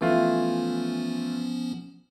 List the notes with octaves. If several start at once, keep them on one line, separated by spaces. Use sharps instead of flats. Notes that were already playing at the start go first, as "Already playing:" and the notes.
E3 F3 A3 B3 C#4 F4